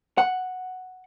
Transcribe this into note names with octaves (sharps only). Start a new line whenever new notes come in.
F#5